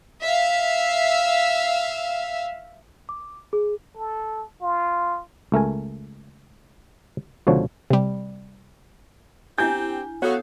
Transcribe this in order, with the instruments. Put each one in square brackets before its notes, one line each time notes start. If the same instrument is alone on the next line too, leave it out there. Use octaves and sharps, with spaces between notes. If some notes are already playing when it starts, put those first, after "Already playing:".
[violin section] E5 F5
[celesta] D6
G#4
[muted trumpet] A4
F4
[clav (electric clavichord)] C#2 A3 A#4 G#5
C#2 B2 D3 F3 C#5
[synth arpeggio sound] C3 G3
[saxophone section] C4 G4 [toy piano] D4 E4 G#5 [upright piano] G6
[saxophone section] F#3 F#4 [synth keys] B3 A4 F5 [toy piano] C#5 D#6